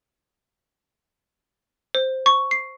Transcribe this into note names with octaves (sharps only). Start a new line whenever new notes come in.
C5
C#6
C7